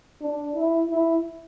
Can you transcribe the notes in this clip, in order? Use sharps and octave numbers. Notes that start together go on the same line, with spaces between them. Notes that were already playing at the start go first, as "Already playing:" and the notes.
D4
E4
E4